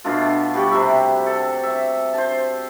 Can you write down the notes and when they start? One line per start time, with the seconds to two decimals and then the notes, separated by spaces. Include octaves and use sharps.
0.04 B2 A3 D4 F4
0.54 G3 F#4 G4
0.71 C3 E5
1.26 A4
1.63 E5
2.13 C5 A5